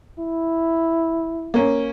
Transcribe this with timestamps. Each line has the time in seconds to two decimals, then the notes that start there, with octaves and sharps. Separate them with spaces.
0.19 E4
1.54 A#3 C#4